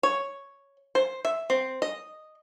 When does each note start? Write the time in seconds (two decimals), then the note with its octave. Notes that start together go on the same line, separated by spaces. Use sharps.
0.03 C#5
0.95 C5
1.25 E5
1.50 C4
1.82 D#5